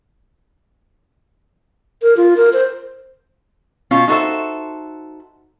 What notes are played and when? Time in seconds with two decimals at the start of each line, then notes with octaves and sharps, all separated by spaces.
2.02 A#4
2.17 F4
2.37 A#4
2.53 C5
3.91 B2 C#4 F4
4.08 D#4 F#4 A4 C5 E5